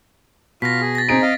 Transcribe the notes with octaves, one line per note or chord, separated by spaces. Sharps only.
B2 F4 F5 A#6 B6
G#4
A6 A#6
C4 D#4 G#4 D7
D#5 F5